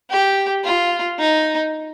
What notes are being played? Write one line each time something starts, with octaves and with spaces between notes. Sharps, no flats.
G4
F4
D#4